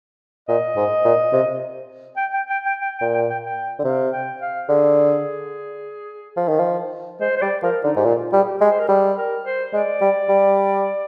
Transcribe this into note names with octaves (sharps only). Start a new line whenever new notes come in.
A#2 D#5
G#2
A#2
C3
G5
G5
G5
G5
G5
G5
A#2
G5
G5
G5
D3
C3 F5
G5
F5
D3 G#4
F3
D#3
F3
G#3 C5
C5
G3 D5
F3 A#4
D3 D#4
G#2 G4
A#2 F4
G3
G#4
G4
G#3
C5
A#4
G3 G#4
A#4
C5
G#3 D5
G3
G3